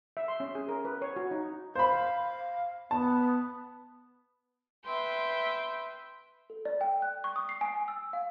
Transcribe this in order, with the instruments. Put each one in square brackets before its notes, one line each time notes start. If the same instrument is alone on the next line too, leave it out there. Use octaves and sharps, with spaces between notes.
[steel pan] E5
C6
C#4
G#4
A#4
B4
C#5
F#4
D#4
[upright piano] C5 B5 [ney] F5
[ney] B3 [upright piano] A5
[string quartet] B4 E5 G5 C6
[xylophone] A4
D5
G5
F#6
C#6
D#6
C7
G#5
E6
F5